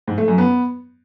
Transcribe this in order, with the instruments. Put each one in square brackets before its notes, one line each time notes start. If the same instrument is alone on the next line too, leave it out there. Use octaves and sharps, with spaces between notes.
[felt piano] G#2
A3
F#2
B3